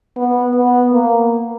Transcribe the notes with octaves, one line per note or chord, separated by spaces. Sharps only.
B3
B3
A#3